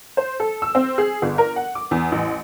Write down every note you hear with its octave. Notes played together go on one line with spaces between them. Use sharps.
C5
A4
E6
C4
G#4
G1
A#4
F#5
D6
E2
A1